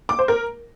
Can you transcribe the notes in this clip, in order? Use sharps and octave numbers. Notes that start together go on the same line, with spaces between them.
D6
C5
A#4